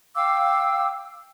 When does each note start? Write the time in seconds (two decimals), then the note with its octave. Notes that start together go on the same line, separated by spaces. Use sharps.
0.15 F5 G5 D6 E6